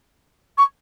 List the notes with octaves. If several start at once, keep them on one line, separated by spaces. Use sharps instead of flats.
C#6